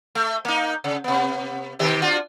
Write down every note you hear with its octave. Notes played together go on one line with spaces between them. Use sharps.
A3
A#3 D#4
C#3
C3 B3
C3 D#3 G4
D4 F4 F#4